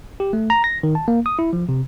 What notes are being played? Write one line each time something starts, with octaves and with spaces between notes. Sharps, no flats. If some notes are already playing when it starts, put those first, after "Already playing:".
G4
A3
A#5
A#6
D#3
A5
A#3
D#6
E4
F3
C3